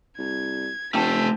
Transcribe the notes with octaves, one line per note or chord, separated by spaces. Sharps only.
C2 G#6
F1 A3 D4 C5 G5 A5 G6 B6